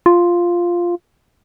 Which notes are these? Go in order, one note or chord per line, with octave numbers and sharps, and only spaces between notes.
F4